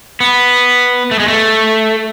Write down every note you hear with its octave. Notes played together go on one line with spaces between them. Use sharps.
B3
A3
G#3
A3